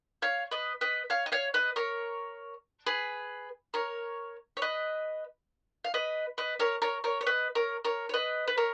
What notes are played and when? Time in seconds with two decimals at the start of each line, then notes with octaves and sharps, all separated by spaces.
0.22 C#5 F5
0.51 B4 D#5
0.81 B4 D#5
1.10 C#5 F5
1.26 D#5
1.32 C#5 F5
1.54 B4 D#5
1.76 A#4 C#5
2.87 G#4 B4
3.74 A#4 C#5
4.57 C#5
4.62 B4 D#5
5.84 F5
5.94 B4 D#5
6.38 B4 D#5
6.59 A#4 C#5
6.82 A#4 C#5
7.04 A#4 C#5
7.21 C#5
7.27 B4 D#5
7.55 A#4 C#5
7.85 A#4 C#5
8.09 C#5
8.14 B4 D#5
8.48 B4
8.58 A#4 C#5